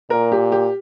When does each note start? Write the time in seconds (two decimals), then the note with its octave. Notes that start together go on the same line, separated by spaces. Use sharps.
0.10 A#2 A#4
0.32 G4
0.52 G4